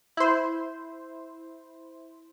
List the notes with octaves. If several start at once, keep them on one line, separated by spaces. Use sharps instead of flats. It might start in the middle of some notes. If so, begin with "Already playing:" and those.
E4 C5